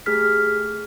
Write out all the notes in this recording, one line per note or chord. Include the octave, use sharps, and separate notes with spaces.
A3 G4 G#4 F6 B6